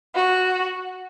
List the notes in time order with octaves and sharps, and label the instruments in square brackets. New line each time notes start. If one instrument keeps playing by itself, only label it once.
[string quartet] F#4